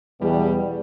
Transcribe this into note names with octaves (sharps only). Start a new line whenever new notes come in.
E2 B2 G3